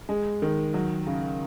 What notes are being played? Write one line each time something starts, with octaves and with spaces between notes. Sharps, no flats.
G#3
D#3
F#3
C#3